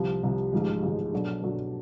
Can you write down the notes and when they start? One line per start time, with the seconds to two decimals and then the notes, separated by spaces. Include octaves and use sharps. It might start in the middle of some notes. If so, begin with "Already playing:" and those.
Already playing: C2 C3 F3
0.23 C2 C3 F3
0.53 A1 G#2 F3 G#3
0.83 A1 G#2 F3 G#3
1.13 B2 F#3 A3 D4
1.43 B2 F#3 A3 D4